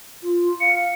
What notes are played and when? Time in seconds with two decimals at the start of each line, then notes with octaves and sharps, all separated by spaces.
0.23 F4
0.61 F5 C#7